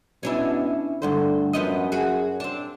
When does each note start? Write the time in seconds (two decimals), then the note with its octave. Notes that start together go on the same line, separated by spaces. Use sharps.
0.23 B2 C#4 D4 E4
1.02 D2 G2 D3 C5
1.53 F#2 F3 B3 D#5
1.92 F#4 G#4
2.40 C4 D4